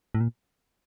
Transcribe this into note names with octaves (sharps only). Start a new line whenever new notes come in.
A2
A#2